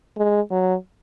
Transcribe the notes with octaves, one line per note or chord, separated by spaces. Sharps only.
G#3
F#3